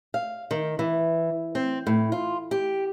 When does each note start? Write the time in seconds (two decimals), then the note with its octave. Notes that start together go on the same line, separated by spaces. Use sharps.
0.14 F5
0.51 D#3
0.79 E3
1.55 C4
1.87 A2
2.12 F4
2.51 G4